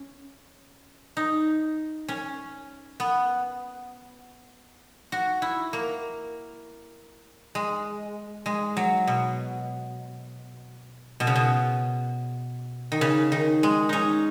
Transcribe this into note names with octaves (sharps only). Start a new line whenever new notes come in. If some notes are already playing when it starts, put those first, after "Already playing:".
Already playing: C#4
D#4
C#4
B3
F#4
E4
A#3
G#3
G#3
F#3
B2
B2
C#3
B2
D#3
C#3
D#3
G#3
C#4 D#4